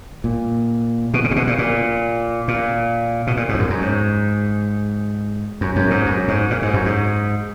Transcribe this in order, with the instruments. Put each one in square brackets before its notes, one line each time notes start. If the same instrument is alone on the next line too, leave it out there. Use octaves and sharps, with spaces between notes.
[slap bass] A#2
B2
C#3
A#2
B2
A#2
A#2
A#2
B2
A#2
G#2
E2
F#2
F#2
G#2
F#2
F#2
G#2
F#2
G#2
A#2
G#2
F#2
G#2